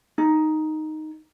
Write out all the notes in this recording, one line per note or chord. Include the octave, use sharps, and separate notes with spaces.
D#4